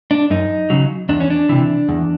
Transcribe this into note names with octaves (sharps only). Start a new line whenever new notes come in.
D4
F#2 D#4
C#3 F#3
E2 D4
C#4
D4
C3 E3
E2